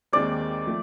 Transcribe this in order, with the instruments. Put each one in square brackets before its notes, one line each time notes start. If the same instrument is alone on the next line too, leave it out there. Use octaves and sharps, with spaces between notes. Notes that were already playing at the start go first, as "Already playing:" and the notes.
[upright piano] D#2 D#3 G#3 C4 [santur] D5
[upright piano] F3 A3